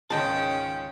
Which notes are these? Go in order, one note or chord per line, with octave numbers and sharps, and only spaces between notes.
C#2 G#2 D#3 G#3 C#4 G5 A5